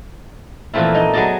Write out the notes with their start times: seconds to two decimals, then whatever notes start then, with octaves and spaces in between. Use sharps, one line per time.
0.74 A#2 E3 F3 A3 C4 E4
0.94 D#4 D#5
1.13 F#3 B3 G#4 D5 D#5 A5